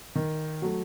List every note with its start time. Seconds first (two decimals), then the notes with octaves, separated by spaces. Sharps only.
0.15 D#3
0.62 F#3 A3